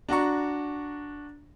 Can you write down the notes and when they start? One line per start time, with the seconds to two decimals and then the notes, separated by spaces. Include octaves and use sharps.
0.09 D4 F#4 A#5 C#6